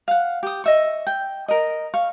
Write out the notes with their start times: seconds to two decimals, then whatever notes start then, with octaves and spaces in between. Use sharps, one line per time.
0.08 F5 F#5
0.43 G4 D#6
0.64 D#5 E5 C#6
1.07 G5
1.48 A#4 D#5
1.94 F5 C#6